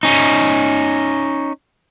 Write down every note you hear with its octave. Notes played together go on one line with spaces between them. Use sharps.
C#4 D#4